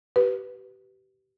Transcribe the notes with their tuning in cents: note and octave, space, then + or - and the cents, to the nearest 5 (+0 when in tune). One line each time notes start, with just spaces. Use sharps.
G4 -30 B4 +0